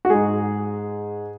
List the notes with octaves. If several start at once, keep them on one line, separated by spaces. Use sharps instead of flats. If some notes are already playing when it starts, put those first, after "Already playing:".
F#4
G#2 G#3 G#4